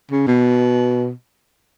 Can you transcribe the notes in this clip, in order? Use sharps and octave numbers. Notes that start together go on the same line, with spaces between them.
C#3
B2